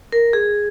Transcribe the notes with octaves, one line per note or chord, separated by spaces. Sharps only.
A#4
G#4